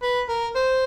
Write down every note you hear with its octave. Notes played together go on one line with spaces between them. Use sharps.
B4
A#4
C5